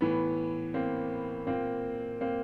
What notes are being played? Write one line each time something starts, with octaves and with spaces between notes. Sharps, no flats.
A2 E3 B3
A#3 C4
A#2 A#3 C4
A#3 C4